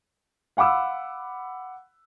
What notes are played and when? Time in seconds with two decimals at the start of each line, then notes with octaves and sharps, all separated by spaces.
0.57 F5 F#5 B5 D6 E6